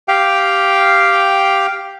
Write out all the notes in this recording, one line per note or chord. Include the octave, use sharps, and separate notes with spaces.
G4 F5 G5